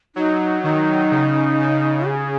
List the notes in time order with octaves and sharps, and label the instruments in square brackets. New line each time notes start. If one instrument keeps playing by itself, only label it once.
[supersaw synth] F#3 [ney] D#4
[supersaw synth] D#3 [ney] D#4
[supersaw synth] C#3
C#3
[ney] G#4